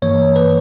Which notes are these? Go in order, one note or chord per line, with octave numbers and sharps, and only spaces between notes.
G2 E3 A#3 C#5
B4